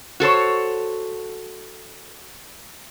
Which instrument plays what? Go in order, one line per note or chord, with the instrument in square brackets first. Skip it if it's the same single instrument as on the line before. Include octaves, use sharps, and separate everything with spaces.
[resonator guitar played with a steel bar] F#4 A4 C5 C#5